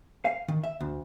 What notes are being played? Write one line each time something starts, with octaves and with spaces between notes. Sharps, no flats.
F5
D#3
E5
D2